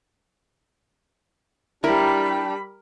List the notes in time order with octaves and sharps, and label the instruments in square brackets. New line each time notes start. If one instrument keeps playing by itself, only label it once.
[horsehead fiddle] G3 B5 [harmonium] D4 G4 [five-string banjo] E4 [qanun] A#4